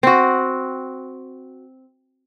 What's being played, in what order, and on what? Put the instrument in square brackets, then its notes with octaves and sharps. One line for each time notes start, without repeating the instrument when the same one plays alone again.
[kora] C4 F#4